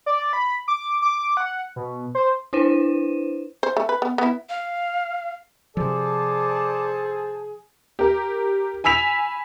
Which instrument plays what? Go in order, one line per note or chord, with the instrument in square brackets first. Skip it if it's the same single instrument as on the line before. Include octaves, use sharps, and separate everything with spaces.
[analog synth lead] D5
B5
D6
D6
F#5
B2
C5
[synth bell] D4 E4 B4 C5 D#7 E7
[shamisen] C5
A3
B4
B3
B3 E4
[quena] F5
[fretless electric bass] C3 F3 [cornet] G#4 [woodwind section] A4 C5 A5 [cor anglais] D5
[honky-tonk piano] G4 A#4
G#5 B5 E6 B6 F7